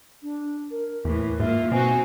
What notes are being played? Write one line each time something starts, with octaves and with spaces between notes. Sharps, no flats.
D4
A#4
E2 A2 E3
G#2 A#3 F4 E5
B2 C4 D#4 F#4 G#5